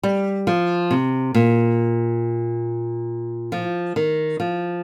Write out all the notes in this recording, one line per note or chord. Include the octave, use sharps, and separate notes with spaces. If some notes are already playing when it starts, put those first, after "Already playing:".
G3
F3
C3
A#2
F3
D#3
F3